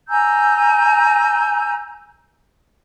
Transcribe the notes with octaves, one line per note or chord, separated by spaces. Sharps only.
G#5 A#5 E6 G6